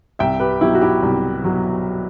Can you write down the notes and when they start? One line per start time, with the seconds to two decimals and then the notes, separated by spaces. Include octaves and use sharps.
0.19 C2 E5 G5
0.40 G4 B4
0.61 B2 F#3 E4 G4
0.75 F#4
0.81 E4 G4
1.03 C2
1.44 B2 F#3